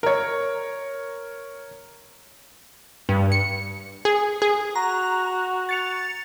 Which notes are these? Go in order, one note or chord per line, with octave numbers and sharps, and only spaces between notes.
A#4 C#5
G2
C#7
G#4
G#4
F#4 A#5
A6 C#7 F7